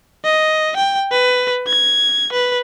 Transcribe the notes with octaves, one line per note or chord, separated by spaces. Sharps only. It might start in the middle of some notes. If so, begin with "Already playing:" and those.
D#5
G5
B4
G#6
B4